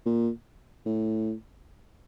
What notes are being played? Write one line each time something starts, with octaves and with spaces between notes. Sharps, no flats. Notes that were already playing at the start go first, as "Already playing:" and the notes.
A#2
A2